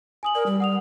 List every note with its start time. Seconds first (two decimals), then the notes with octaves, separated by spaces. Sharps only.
0.23 G#5 D#6 F#7
0.35 A#4 D5
0.46 G3
0.60 F#5 D#6 F7